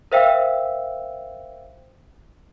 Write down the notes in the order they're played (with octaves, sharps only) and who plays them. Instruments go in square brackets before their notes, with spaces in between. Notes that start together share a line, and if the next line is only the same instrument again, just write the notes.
[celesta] A#4 C5 E5 F5 G5 E6